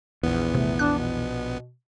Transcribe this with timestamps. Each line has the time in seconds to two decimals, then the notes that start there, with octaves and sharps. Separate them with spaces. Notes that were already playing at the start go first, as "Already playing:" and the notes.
0.23 A#1 E2 B3
0.55 C3 A3
0.79 D4 F#6
0.98 B2